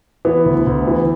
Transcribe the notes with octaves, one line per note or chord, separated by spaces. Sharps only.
E3 B3
D2
D2
E3